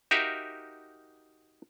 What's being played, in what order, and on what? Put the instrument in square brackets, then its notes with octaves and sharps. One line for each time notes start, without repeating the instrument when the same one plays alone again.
[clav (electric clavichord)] D#4 F#4 G4 A#4 E5 F5